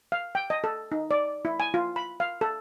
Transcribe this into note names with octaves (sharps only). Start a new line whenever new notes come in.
F5
G5
D#5
A4
D#4
D5
E4
G#5
F4
B5
F5
A4